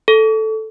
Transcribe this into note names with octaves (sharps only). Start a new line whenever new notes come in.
A4